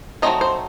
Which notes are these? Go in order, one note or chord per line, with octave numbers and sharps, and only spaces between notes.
F#3 A3 C4 D#4 D#5
C5